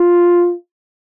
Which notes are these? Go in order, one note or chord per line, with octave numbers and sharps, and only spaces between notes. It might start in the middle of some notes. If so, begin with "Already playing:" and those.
Already playing: F4